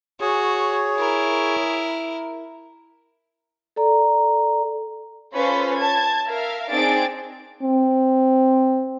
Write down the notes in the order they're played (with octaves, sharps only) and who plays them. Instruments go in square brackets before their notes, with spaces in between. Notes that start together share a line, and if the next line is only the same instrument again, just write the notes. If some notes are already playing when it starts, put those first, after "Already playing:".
[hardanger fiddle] F#4 [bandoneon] G#4 C#5
[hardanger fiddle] E4 A#4
[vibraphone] A4 D5 A#5
[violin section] C#4 F4 A4 B4 C5
A5 G#6
A#4 E5 F5
C4 D4 D#4 G#4 A6 D7
[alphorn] C4